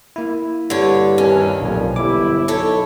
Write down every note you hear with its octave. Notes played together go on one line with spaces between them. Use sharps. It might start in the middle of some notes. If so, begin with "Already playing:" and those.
A#3 E4
G2 D3 C#5
D#2 C#4
B1 F2 A#2
G1 E4 D6
B1 A4 C#5